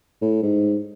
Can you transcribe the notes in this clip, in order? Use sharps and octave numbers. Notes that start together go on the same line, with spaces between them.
A2
G#2